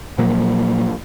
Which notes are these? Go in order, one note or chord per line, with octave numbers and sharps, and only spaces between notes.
A#2 F3 F#3 A#3